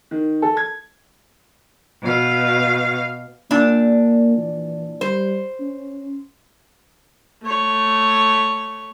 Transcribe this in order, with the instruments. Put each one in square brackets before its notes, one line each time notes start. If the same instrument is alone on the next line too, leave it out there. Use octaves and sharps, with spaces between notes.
[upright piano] D#3
A4
G#6
[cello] B2 F5
[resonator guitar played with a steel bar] A#2 D4 [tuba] A#3
[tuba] E3
[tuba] G3 [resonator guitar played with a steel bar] C5
[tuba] C#4
[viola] A3 C#5